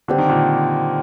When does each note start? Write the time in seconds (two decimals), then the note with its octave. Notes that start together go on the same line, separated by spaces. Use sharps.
0.08 D3 G3 C4 G4
0.18 D#3
0.29 A#2 D3